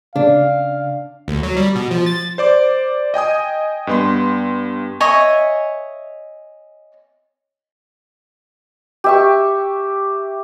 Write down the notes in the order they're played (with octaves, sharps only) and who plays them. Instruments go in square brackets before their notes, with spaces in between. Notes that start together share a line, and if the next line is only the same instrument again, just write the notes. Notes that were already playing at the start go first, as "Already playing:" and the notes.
[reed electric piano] C#3 [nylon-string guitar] D4 [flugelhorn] F5
[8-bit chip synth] D2
F#3
G3
B2
F3
A6
[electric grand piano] C5 D5 D6
D#5 G5 G#5 D#6
G2 B3 C6
[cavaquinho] C#5 D#5 E5 G#5
[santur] G4 E5 C#6